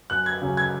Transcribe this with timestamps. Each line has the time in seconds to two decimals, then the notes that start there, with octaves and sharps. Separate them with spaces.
0.10 F#2 F#6
0.26 G#6
0.42 C#3 F#3 C#4
0.57 G#6